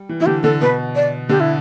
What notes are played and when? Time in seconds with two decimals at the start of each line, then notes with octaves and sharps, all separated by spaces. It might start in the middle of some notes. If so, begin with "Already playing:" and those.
Already playing: G3
0.09 E3
0.20 E3 E4
0.26 D3 G4
0.43 D3 A4
0.61 B2 B4
0.96 D5
1.29 D3 G4
1.40 E4